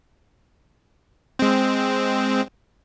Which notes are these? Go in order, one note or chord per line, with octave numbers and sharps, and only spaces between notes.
G#3 C4